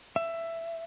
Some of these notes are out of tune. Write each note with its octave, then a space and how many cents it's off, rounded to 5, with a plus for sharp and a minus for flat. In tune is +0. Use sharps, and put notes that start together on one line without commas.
E5 +15